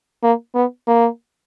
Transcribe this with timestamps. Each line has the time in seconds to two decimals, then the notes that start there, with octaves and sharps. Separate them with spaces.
0.23 A#3
0.55 B3
0.88 A#3